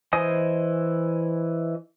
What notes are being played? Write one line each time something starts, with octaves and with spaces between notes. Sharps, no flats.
E3 C5 D#5 G#5 D#6